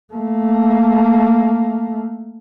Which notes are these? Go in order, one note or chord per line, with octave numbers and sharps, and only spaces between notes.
A3 A#3